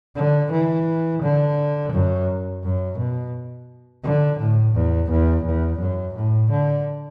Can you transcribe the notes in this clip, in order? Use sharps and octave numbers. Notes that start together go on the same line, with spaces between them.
D3
E3
D3
F#2
F#2
B2
D3
A2
E2
E2
E2
F#2
A2
D3